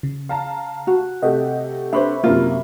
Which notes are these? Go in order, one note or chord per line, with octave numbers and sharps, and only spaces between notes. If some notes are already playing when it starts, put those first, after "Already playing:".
C#3
F5 A5 A#5
F#4
C3 A3 G4 D#5 F#5
D4 B4 C5 E5 B5 C#6
F#2 C3 A#3 F4